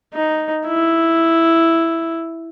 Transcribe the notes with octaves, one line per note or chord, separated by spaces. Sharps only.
D#4
E4